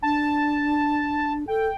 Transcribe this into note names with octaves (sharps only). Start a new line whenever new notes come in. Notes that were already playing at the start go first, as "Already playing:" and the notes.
D4 A5
A4 G5